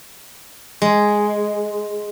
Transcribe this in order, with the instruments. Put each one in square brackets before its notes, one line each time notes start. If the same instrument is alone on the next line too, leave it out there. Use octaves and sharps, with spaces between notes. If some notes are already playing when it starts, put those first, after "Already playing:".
[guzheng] G#3